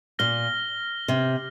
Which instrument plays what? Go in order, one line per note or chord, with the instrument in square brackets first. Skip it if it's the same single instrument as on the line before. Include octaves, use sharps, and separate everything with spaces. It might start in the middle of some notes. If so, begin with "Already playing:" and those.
[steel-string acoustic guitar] A#2 [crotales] F6 A#6 G7
[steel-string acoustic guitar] C3